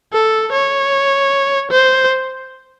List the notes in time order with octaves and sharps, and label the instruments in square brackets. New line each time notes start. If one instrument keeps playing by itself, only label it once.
[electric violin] A4
C#5
C5